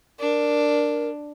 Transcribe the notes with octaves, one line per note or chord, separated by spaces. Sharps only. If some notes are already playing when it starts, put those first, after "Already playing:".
D4 A#4